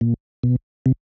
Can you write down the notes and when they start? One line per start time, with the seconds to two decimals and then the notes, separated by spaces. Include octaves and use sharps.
0.01 A#2
0.43 B2
0.86 C3